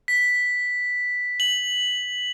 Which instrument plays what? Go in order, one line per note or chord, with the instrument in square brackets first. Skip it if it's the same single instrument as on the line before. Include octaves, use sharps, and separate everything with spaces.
[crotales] B6
F#7